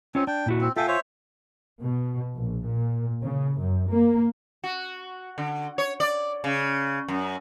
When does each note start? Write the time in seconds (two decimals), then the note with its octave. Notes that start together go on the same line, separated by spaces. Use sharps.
0.15 C4 C#4 F4 C#5
0.27 D4 G5
0.46 A#2 E4 F#4
0.61 C4
0.76 F4 A4 E5 F5 G5 G#5
0.88 C5 C#5 E5
1.81 B2
2.34 A#1
2.65 A#2
3.21 C#3
3.59 F#2
3.88 A#3
4.64 F#4
5.38 D3
5.78 C#5
6.00 D5
6.44 C#3
7.08 F#2